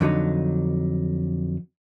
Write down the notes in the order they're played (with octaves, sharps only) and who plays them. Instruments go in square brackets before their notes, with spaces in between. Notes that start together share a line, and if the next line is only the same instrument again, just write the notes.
[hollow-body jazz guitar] F2 D3 F#3 D#4